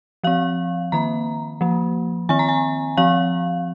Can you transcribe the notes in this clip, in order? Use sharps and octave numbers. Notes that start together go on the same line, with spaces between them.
F3 C4 F5
D#3 A#3 A#5
F3 A#3
D#3 C4 G#5
A#5
G#5
F3 C4 F5